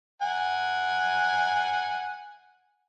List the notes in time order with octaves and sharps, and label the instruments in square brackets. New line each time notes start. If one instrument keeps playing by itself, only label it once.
[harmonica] F#5 G#5